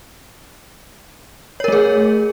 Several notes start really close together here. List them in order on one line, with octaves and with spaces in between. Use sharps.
C#5 A#4 A3 G#4